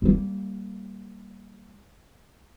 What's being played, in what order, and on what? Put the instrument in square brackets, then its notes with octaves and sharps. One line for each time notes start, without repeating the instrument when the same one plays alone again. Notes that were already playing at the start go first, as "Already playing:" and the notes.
[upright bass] G3 A#3